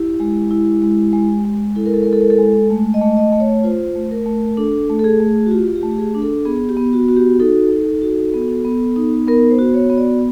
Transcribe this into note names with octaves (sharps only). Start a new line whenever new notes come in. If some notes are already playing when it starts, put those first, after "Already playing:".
Already playing: E4 G4
G#3
E4
G#3
G#3
G#3
E4 A4
A#4
A4
A#4
G#3
A4
A#4
A4
G#3
A3
D#5
A3
D#5
A3
C#5
F4 C5
A3
A#4
A3
D4 A4
A3
A4
G#4
A3
F#4
F4 G4
G4
A3
G4
G#4
D4
A4
B3 G#4
G4
B3
F#4
F#4
G4
D#4 A4
D#4
F#4
B3
B3
D#4
B3 A#4
C5
F#4
C#5
B3
D5